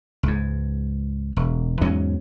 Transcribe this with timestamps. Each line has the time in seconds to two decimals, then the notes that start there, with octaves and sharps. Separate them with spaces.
0.23 C#2 G#2
1.36 E1
1.81 E2 G#2 F#3 C#4